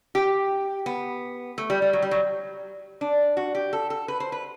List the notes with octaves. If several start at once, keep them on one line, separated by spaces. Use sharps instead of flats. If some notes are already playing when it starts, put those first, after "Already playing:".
G4
B3
A3
G3
G3
F#3
G3
F#3
D4
F#4
G4
A4
A4
B4
C5
B4